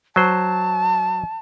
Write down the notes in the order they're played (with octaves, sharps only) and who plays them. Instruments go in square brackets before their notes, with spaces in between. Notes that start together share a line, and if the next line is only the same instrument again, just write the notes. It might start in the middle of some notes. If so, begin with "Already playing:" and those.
[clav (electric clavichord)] F#3 C5 [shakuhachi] A5